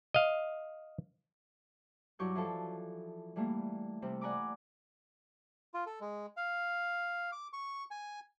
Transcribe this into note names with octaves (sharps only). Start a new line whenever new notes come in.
D#5 F5
G2 F#3 E4 C#6 D6 G6
E3 F3 A4
E3 G3 A3 A#3
C3 G3 C4
D5 F#5 G#5 A#5 B5 D6
F4
A4
G#3
F5
D6
C#6
G#5